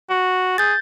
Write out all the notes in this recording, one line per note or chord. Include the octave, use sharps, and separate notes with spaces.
F#4
G#4 G6 A6